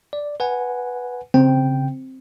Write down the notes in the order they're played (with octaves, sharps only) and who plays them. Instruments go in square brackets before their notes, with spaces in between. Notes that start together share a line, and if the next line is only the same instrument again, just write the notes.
[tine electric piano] D5
B4 F#5 G#5
[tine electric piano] C#3 G5 [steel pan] C4